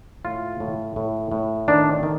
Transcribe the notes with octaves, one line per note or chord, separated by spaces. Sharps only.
A2 F4
A2
A2
A2
D#3 D4
D#3